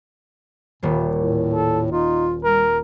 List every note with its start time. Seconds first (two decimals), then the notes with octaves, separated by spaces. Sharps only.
0.83 D#1 A#2 A#3
1.17 A2
1.54 A4
1.91 D#4 F4
2.44 G3 A#4